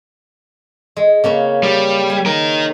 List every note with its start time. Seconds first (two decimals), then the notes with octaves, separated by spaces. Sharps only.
0.97 G#3
1.24 C#3 A#3 C#4
1.63 G3
2.10 G#5
2.26 D#4 A#4